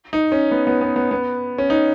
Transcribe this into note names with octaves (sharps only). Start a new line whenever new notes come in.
D#4
C#4
B3
B3
B3
B3
B3
C#4
D#4